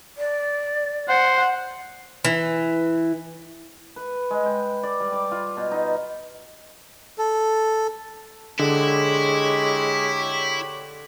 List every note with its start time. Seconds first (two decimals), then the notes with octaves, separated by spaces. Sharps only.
0.17 D5
1.09 C5 F#5
2.24 E3
3.96 B4
4.31 G#3
4.46 G5
4.83 D5
5.00 G3
5.13 D6
5.31 F4
5.57 B2
5.71 D#4
7.18 A4
8.59 D3 G#3 E4 G4 C#5